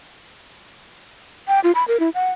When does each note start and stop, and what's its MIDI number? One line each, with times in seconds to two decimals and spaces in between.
1.48 1.60 79
1.64 1.72 65
1.75 1.84 83
1.88 2.00 70
2.00 2.10 64
2.14 2.31 78